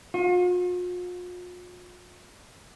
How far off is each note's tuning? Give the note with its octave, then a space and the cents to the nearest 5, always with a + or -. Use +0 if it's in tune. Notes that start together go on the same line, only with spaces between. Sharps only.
F4 +45